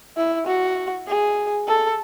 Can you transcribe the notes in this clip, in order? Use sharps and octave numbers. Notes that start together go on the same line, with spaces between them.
E4
F#4
G#4
A4